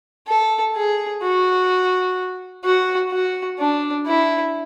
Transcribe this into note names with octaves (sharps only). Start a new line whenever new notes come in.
A4
G#4
F#4
F#4
F#4
D4
E4